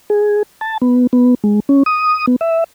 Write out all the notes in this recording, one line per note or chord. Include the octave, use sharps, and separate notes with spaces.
G#4
A5
B3
B3
G#3
C#4
D#6
B3
E5